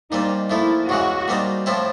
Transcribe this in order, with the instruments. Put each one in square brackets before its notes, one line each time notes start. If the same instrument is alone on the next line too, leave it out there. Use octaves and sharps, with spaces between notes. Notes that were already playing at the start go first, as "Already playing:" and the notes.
[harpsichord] A#2 G3 C4 [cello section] D#4
[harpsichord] A#2 F3 A3 [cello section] E4
[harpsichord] E2 C#3 E3 G#3 [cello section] F#4
[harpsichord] A#2 G3 C4 D#4
A2 F3 A3 C4 E4